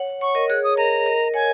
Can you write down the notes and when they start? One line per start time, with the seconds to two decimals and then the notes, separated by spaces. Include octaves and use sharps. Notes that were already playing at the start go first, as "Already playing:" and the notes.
Already playing: C#5 F#5
0.21 C#5 F#5 C#6
0.35 A#4 D#5
0.49 G#4 C#5 F#6
0.64 D#6
0.77 A#4 D#5 A#5
1.06 A#4 D#5
1.34 C#5 F#5 G#5